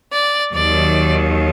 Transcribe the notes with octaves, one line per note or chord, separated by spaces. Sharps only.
D5
D#2 D#3 F#3 D5